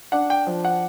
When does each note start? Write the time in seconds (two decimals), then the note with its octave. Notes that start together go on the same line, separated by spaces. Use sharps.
0.12 D4 F#5
0.30 G5
0.47 F3
0.65 F#5